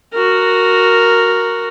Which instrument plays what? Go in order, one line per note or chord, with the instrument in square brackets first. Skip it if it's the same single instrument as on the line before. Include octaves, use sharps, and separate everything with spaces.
[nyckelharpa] F#4 A#4